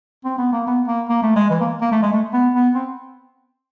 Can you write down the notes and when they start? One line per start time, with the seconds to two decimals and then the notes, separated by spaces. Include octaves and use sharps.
0.25 C4
0.38 B3
0.52 A#3
0.67 B3
0.87 A#3
1.09 A#3
1.22 A3
1.36 G#3
1.50 E3
1.61 A#3
1.81 A#3
1.92 A3
2.03 G#3
2.13 A3
2.34 B3
2.54 B3
2.75 C4